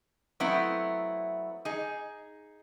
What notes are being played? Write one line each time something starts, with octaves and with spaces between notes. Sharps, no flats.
F#3 A3 B3 C4 E4
D#4 G#4